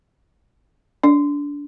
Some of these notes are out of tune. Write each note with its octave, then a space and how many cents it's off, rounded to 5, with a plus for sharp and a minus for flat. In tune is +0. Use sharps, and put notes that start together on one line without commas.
D4 -25